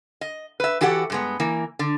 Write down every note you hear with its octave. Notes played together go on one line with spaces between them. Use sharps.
D#5
B4 E5
E3 F#4 G4 A4 F#5
G2 G#3 B3
E3 A#3
D3